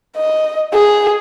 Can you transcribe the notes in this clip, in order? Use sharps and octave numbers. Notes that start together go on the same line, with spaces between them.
D#5
G#4